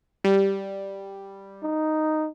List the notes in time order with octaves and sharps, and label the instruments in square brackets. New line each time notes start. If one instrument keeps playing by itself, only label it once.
[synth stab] G3
[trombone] D#4